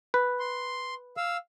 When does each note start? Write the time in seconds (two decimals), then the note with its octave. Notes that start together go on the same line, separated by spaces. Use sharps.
0.14 B4
0.39 C6
1.17 F5 E6